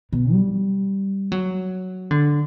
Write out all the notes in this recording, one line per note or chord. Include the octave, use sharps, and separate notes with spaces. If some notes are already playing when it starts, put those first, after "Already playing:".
B2
G3
F#3
D3